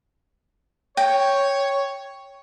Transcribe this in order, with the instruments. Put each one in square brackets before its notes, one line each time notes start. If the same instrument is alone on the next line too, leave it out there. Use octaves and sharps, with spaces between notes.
[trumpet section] C#5 [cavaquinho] G5